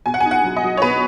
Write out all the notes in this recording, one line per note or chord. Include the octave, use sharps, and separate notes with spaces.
B2 G#5
F#5
G#5
D#4
F#5
F#3
D#5
F#3
C#5
B2 B4